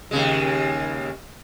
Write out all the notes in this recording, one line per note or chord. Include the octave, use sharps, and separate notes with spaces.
D#2 C#3 G#3